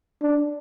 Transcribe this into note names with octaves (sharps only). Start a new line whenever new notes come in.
D4